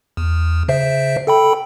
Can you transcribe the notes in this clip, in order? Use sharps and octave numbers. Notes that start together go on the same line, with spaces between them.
E2
C#3 C5 E5
A4 G5 B5